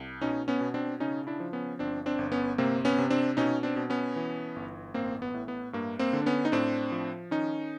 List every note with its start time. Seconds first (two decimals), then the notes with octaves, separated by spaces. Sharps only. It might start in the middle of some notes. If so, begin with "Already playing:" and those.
Already playing: C2
0.21 B2 C#4 D#4
0.48 B3 C#4
0.61 B2
0.74 C4 D4
1.00 C#3 C#4 D#4
1.27 D4 E4
1.40 F3
1.53 B3 C#4
1.79 G1 C4 D4
2.06 C4 D4
2.18 G1
2.32 B3 C#4
2.58 C3 A#3 C4
2.85 B3 C#4
2.98 C3
3.10 C4 D4
3.37 B2 C#4 D#4
3.63 C4 D4
3.76 B2
3.90 B3 C#4
4.16 E3
4.56 G1
4.94 A1 A#3 C4
5.22 B3
5.34 A2
5.48 B3
5.73 G2 A#3
5.99 A#3 C4
6.13 D3
6.21 D4
6.26 B3 C#4
6.45 D#4
6.52 A2 C4 D4
6.92 F3
7.31 D#3 C#4 D#4